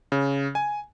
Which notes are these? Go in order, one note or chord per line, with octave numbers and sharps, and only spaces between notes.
C#3
G#5